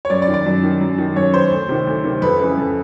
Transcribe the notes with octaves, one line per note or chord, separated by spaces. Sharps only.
C#5
F#2 D5
D5
D#3
D5
F#2
D#3
F#2
D#3
F#2 C#5
D#3 C5
D2
C3 D#3
D2
C3 D#3
F2 B4
C#3 E3 B4
F2